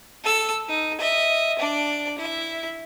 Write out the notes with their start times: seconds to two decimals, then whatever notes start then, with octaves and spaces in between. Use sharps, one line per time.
0.24 A4 E6
0.69 D#4
0.99 D#5 E5
1.59 D4 D5
2.18 E4 E5